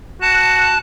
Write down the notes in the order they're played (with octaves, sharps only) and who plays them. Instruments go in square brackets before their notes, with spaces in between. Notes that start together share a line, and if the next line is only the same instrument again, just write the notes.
[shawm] F#4 [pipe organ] A5 F#6